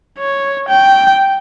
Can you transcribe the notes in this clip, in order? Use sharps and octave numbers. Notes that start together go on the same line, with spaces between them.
C#5
G5